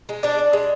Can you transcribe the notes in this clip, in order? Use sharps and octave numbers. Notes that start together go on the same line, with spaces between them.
G#3
D4 D5
D4
G#3